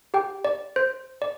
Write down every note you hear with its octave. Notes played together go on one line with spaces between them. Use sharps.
G4 G5
D5
C5
D5